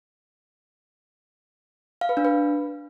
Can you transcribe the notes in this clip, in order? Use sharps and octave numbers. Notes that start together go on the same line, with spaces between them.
F5
B4
D4
B4